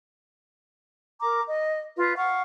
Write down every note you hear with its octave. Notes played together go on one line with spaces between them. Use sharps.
A#4 A#5 D6
D#5
F4 B4
F5 F#5 C#6